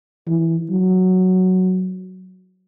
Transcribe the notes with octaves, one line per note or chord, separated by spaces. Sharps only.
E3
F#3